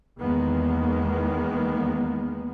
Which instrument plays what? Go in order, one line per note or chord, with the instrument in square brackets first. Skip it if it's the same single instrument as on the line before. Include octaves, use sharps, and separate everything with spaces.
[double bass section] E2 D#3 G#3 A#3 B3